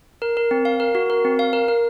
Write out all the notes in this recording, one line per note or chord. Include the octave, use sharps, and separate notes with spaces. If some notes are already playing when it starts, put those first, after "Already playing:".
A#4
A#4
C4
F5
A#4
F#4
A#4
C4
F5
A#4
A#4